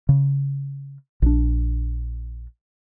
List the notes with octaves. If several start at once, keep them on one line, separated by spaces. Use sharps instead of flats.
C#3
A#1 D4